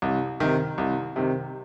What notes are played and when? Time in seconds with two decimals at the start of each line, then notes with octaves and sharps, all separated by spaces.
0.02 C2
0.40 C3 D#3
0.78 C2
1.16 C3 D#3